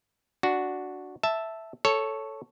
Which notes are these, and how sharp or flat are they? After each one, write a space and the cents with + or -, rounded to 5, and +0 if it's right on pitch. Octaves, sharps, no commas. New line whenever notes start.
D4 +0 F#4 +0
E5 +0 A5 +0
A4 +0 C#5 +0